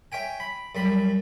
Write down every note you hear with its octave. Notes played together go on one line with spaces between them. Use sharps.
C#5 E5 G5 G#5
B5
F#2 G3 B5